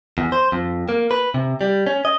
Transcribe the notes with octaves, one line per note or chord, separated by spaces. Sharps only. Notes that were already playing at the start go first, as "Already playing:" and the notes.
E2
C5
F2
A#3
B4
C3
G3
C#4
D#5